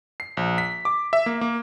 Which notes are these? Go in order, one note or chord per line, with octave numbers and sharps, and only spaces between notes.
C7
A#1
B6
D6
E5
A#3
A#3